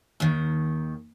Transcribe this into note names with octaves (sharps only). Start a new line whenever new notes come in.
D#2 D#3